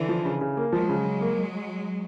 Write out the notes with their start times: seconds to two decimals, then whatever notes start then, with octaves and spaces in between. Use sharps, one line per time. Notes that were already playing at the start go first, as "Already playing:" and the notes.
Already playing: D3 E3
0.09 F3
0.25 C#3
0.41 C#3
0.57 A#3
0.72 F3 F#3 G#3
0.89 C#3
1.05 C#3
1.21 A#3